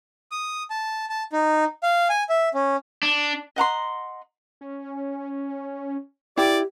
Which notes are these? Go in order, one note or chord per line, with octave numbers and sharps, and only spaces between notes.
D#6
A5
A5
D#4
F5
G#5
E5
C#4
D4
D#5 F#5 A#5 C6
C#4
E4 G4 D5 G5